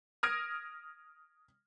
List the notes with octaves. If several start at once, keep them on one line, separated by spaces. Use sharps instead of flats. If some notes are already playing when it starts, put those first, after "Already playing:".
D#6 F6 G#6 A#6 D7